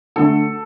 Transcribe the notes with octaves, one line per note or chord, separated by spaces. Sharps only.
D3 A3 A4